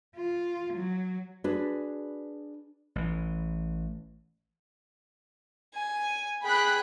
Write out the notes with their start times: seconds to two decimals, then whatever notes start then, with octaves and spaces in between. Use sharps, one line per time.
0.16 F4
0.74 F#3
1.44 D4 F#4 G#4 B4
2.96 A1 E3
5.75 G#5
6.44 G#4 G5 B5 F#6